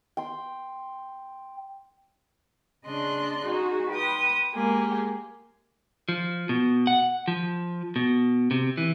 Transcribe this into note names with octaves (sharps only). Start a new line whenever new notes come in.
G5 C6
C#3 D4 D#5 C6 F#6
D#4 F#4 G#4
B4 G5 C6 D#6
G#3 A#3 G4 G#4
F3
B2
F#5
F3
B2
C3
E3